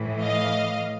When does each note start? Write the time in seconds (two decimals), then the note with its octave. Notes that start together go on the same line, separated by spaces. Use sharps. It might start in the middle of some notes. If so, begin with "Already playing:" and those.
Already playing: A2 E3
0.21 D#5 F5